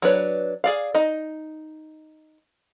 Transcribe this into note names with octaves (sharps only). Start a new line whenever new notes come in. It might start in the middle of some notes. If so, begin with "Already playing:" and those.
F#3 D4 B4 C#5
G#4 D5 F5
D#4 D#5